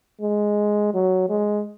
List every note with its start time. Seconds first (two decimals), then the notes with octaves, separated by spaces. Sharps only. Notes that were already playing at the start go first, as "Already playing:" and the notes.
0.21 G#3
0.94 F#3
1.29 G#3